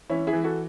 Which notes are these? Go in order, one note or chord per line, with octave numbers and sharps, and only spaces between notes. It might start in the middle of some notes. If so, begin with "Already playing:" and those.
E3 C#4 E4
E4 G#4
E3
F#4 A4